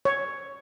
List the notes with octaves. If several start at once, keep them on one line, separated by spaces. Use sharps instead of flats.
C#5